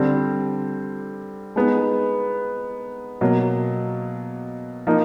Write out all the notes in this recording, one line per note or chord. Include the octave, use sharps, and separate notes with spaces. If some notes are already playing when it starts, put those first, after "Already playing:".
Already playing: D3 G3 C4
G#3 B3 D#4
B2 F#3 A#3
F3 A#3 D#4